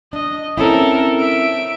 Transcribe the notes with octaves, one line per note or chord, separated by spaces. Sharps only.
D4 D#5
C4 C#4 E4 A4 A#4
E5 D7